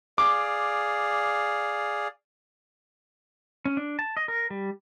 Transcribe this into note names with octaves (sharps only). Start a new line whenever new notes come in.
G#4 D5 F5 D6
C#4
D4
A5
D#5
A#4
G3